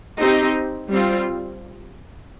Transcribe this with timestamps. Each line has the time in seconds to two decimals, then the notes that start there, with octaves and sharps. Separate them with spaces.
0.20 C4 D#4 G4
0.90 G3 C4 F4